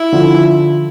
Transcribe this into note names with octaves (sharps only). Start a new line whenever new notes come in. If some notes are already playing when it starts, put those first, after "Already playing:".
Already playing: E4
D3 F3